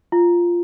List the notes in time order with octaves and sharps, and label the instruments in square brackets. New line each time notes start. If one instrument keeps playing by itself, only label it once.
[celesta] F4